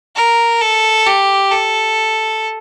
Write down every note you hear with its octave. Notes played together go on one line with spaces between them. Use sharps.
A#4
A4
G4
A4